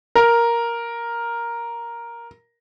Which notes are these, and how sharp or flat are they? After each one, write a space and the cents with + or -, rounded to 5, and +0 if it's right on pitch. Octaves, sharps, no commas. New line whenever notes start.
A#4 +5